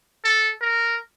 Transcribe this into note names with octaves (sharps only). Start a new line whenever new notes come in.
A4
A#4